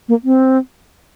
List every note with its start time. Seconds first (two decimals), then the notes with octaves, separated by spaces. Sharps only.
0.08 A#3
0.24 C4